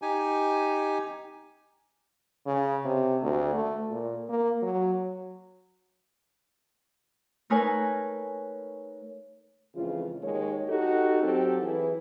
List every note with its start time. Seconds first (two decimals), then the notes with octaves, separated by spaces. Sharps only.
0.02 D#4 G4 G#5
2.46 C#3
2.85 C3
3.22 D2
3.55 A3
3.91 A#2
4.29 A#3
4.62 F#3
7.50 A3 D#4 A#4 B4 C#5 G#5
9.75 F2 C#3 E3 G#3 F4
10.23 D#2 D#3 G#3 C#5
10.69 D#4 F#4 G4 A4
11.23 F#3 C4 G4 A4
11.62 E3 E4 G#4